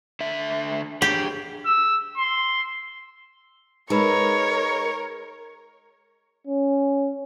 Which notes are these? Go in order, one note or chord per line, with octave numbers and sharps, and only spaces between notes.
D3 E5
D4 G4 G#4
E6
C6
G#3 D#4 A#4 B4 C#5 B5
C#4